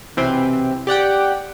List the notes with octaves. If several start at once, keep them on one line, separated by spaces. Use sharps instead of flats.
B1 C3 E3 C4
G4 D5 F#5 G5